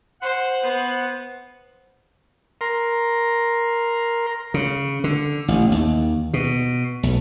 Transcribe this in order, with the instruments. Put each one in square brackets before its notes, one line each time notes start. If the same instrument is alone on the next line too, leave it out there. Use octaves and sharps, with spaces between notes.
[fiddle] C5 [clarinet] F#5
[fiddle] B3 C5
[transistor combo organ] A#4 C6
[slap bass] C#3
D3
A1
D#2
B2
B1